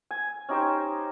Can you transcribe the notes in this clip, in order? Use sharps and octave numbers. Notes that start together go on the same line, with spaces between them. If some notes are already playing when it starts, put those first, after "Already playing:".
G#5
C#4 D#4 G4 C5